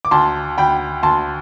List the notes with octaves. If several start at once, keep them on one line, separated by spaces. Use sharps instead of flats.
D6
D2 A5 C6
D2 G5 B5
D2 A5 C6